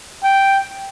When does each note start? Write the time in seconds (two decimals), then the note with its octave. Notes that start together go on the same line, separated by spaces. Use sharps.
0.23 G5